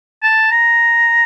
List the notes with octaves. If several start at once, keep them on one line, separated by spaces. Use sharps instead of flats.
A5
A#5